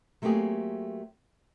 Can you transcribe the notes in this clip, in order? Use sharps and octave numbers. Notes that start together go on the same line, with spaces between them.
F#3 A3 A#3 C4 G4 G#4